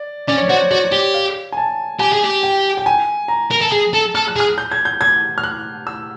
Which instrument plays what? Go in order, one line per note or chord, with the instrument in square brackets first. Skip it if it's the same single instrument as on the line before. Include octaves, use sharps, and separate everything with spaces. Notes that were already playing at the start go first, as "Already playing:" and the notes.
Already playing: [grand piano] D5
[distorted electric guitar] C#4 [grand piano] D5
[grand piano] C#5
[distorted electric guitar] F#4 [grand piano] C5
[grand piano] C#5
[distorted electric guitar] F#4 [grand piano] D5
[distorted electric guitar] G4
[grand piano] F5
G#5
A5
[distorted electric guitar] G4 [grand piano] G#5
[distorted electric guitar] G#4
G4
[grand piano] G5
G5
G#5
A#5
[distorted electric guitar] A#4
A4
G#4
A4
[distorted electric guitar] A4 [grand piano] F6
[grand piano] F#6
[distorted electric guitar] G#4
[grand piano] F6
G6
G#6
G6
G#6
F6
F#6
E6